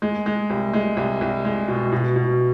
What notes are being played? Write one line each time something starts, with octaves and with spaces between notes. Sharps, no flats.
G#3
G#3
C2
G#3
C2
C2
G#3
B2
B2
B2